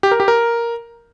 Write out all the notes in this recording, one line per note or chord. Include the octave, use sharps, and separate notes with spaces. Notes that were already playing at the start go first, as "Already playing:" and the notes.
G4
A#4
G4
A#4